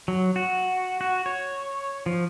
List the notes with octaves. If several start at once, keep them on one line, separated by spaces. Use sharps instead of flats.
F#3
F#4
F#4
C#5
F3